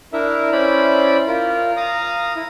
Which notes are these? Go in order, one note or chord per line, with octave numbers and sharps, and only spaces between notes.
D4 E4 A#4 E5
C#4 E4 C5 D5 B5
F4 A#4
F5 A#5 D#6
E4